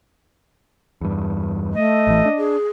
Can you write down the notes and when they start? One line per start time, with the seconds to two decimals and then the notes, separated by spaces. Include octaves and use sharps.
1.01 E2 G2
1.74 A3 D#5
2.07 A1 E3
2.25 D4
2.38 G#4